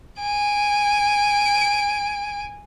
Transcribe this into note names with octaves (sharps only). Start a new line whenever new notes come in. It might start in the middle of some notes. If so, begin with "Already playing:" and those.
G#5 D7